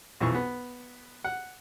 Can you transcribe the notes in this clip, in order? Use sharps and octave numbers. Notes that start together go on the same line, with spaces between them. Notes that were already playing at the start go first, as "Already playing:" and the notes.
B1 F2 E3 C#6
B3
F#5